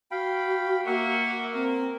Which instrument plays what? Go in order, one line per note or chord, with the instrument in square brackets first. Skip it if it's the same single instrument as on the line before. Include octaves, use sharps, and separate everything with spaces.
[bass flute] F#4 [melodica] F5 G5 B5
[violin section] A#3 [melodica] E5 F#5 C#6
[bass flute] C4 [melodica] A#4